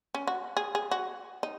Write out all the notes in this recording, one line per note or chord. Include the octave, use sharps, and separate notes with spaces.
C#4
F#4
G#4
G#4
F#4
D#4